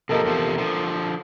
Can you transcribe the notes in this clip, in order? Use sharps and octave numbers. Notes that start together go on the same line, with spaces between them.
C3 F3 A#3 A4 A#4 D#5
E2 C3 F3
D3 F3